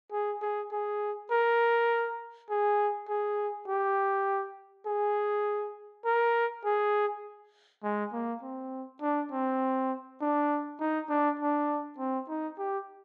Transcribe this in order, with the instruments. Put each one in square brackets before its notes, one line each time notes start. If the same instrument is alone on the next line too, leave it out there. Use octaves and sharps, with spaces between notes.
[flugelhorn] G#4
G#4
G#4
A#4
G#4
G#4
G4
G#4
A#4
G#4
G#3
A#3
C4
D4
C4
D4
D#4
D4
D4
C4
D#4
G4